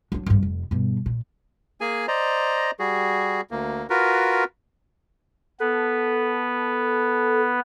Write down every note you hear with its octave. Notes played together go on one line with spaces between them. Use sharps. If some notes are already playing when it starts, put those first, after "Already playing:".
F#3 D4
G#1 G2
F1
G2 B2
A#2
A#3 G#4 G#5
C5 D5 D#5 A#5
G3 F#4 G#4
D2 A#3
F4 F#4 A#4 B4
B3 A4 B4